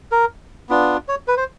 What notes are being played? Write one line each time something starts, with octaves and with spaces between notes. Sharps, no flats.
A#4
B3 D4 F4
C#5
B4
C5